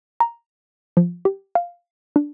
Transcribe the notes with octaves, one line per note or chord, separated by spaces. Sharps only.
A#5
F3
G4
F5
D4